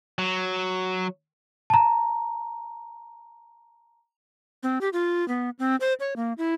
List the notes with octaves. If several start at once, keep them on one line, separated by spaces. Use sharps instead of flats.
F#3
A5 A#5
C4
G4
F4
B3
C4
C5
C#5
A#3
E4